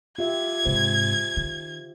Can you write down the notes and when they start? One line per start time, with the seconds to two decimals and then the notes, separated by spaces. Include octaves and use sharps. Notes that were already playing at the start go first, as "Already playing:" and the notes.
0.18 F4 G4 E5 G#6
0.65 G#2 C3 C5
1.37 D#3